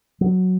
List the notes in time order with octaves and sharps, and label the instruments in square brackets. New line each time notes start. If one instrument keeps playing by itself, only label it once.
[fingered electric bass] F#3